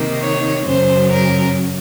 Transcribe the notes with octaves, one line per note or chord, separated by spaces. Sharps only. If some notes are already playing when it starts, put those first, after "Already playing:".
Already playing: C3 D#3 A#3 D#4
C#5
F#2 C#3 F#3 C#4 C5
A#4